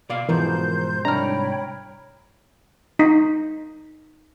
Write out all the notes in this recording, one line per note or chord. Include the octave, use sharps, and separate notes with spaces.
B2 D5 F5
G#2 B2 E3 F3 A#4 C5 G6
C2 G#2 D4 C#5 G5 A#5 B5 F6
D#4